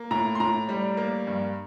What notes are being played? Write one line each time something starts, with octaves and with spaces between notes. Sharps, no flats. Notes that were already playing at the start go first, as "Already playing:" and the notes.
Already playing: A#3
A2 A#5
C6
A2 A#5
G3
A#3
G2